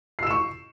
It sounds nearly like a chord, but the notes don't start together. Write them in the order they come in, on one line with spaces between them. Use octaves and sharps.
C7 E6 E7 C#6